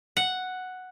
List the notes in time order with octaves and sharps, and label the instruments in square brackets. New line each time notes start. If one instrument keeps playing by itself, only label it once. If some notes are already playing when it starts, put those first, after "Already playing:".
[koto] F#5